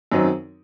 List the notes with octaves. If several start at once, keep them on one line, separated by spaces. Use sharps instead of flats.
F#2 D#3 F#3 C4 D#4